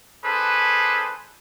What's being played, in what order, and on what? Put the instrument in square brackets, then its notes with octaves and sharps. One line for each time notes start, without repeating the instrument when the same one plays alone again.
[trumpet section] D4 G#4 A4 B4 C5